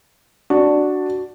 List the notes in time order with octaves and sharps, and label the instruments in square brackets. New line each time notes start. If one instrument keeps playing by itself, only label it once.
[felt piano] D4 [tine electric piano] F#4